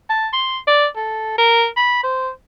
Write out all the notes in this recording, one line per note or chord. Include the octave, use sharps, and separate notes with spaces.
A5
C6
D5
A4
A#4
B5
C5